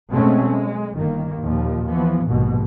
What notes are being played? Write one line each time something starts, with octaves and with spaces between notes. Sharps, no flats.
B2 F#3 G#3 A3 C4 C#4
G#3
G1 D#3 A#3
D#2 A#2 F3
E3 F3 B3
A#1 D#2 G#2 B2